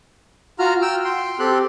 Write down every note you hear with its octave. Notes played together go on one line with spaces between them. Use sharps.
F4 F#4 A#5 F6
G5 E6 F6
G5 C6
C4 G4 A4 C6 F#6